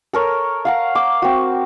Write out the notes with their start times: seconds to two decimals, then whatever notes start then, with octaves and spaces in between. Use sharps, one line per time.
0.13 A4 A#4 C#5
0.65 F5 F#5 A#5
0.95 D6
1.22 C4 F#4